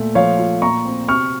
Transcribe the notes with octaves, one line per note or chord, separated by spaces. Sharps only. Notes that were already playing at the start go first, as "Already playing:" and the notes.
Already playing: A#2 A3
F3 C#5 F5
F4
A#2 A#5 C#6
C4
C3 C#6 F6